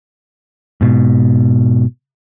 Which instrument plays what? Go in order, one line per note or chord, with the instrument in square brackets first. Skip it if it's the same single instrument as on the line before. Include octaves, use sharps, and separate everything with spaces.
[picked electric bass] G#2 B2